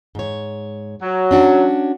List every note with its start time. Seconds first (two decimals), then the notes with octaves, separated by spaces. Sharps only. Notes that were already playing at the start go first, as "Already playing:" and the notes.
0.15 G#2 C#5
1.02 F#3
1.31 C#4 D4 F#4